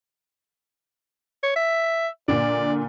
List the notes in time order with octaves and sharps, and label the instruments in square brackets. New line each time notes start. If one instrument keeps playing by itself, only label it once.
[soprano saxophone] C#5
E5
[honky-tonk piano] A#2 D3 [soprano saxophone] D5